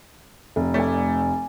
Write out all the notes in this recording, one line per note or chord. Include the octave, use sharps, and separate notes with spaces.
F1
A3 D5 G#5